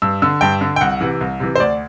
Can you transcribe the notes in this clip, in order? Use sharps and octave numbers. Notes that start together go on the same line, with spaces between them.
G2 E6
D3 E6
G2 G5
D3
G5
C2 F#5
C3 E3
C2
C3 E3
C5
D2 D5